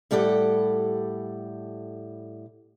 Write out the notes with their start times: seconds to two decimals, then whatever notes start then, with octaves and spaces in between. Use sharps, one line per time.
0.11 A2 G3 G4 A4 F#5